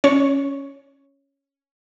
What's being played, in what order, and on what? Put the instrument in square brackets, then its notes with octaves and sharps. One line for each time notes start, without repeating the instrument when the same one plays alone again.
[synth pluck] C#4 C#5